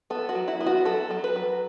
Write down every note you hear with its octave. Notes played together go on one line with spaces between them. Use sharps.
B3 A4
F#4
F#3
E4
B3
F#4
F#3 A4
F#3
B4
F#3